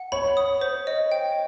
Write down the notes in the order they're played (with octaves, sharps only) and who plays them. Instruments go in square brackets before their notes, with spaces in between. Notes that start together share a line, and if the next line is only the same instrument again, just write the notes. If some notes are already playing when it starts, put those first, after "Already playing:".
Already playing: [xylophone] F#5
[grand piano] C#5 [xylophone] B5
[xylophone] D#6
C5
D#5
G5